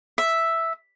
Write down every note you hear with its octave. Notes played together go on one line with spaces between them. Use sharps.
E5